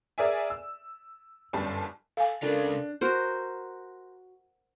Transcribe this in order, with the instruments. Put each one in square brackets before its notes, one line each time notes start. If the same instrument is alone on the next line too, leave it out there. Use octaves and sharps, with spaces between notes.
[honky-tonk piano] G#4 A#4 D5 E5 G#5
E6
G1 F#2 G3 A5
[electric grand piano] A4 [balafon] F5 G#5
[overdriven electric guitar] C#3 F4 [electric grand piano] D4 [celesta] A4 A#4
[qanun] F#4 A#4 C5